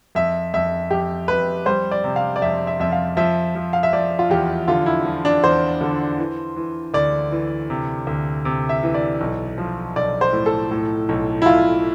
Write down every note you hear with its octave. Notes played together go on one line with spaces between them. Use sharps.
F2 E5
F2 E5
F2 G4
F2 B4
G3 C5
D5
C3
F5
D5
F2 E5
E5
F2 E5
F5
F3 E5
F3
F5
E5
F3 D5
F4
E2 G4
D3 F4
E4
F3
D4
E2 C5
D3
E3
E3
D2 D5
E3
C3
D2
C3
E5
E3
D5
B1
F3
B1 D5
C5
A2
A4
A2
B1
E4
B1 F4